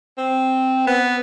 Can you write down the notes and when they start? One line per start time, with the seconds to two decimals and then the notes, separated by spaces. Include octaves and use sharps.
0.18 C4
0.87 B3